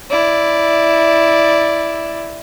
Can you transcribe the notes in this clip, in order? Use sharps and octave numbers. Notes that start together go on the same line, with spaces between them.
E4 D5